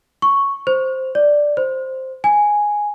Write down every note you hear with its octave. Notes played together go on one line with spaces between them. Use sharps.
C#6
C5
D5
C5
G#5